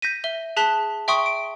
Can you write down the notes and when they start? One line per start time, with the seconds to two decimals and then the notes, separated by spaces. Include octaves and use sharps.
0.02 G6 A#6 B6 D#7
0.24 E5 G7
0.57 G#4 A5 F#6 B6 G7
1.08 E5 G5 C6 C#6 D#6
1.26 D7